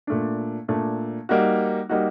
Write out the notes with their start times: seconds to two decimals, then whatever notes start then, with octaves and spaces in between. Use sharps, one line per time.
0.07 A#2 A3 D4
0.68 A#2 A3 D4
1.29 G3 A#3 D#4 F#4
1.89 G3 A#3 D#4 F#4